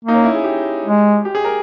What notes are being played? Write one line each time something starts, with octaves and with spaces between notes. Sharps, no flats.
A#3 D#4
C#4
E4
G#4
G4
G#3
G4
G#4
A#4